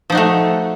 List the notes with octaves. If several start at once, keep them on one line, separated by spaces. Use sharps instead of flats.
F3 A3 D#4 F#4